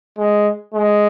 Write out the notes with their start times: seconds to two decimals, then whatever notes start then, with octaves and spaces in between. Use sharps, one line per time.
0.18 G#3
0.74 G#3